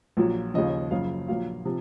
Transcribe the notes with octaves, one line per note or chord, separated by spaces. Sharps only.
A#1 A#2 F#3
D#2 C#3 F3 D#5
F#1 F#2 C#3 F3 F5
A#1 A#2 F#3 F5
C3 F3